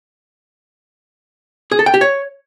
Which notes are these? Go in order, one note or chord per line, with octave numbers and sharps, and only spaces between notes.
G#4
A4
G5
G4
C#5